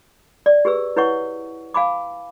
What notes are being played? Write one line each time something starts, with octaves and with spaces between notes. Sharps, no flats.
D5
G4 G#4 B4 E6
E4 B4 C#5 F#5 C#6
F5 G#5 B5 D6